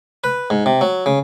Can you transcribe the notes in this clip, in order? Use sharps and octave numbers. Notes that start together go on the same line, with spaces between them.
B4
G#2
C3
F#3
C#3